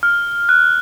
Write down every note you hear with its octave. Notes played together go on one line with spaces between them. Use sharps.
F6
F#6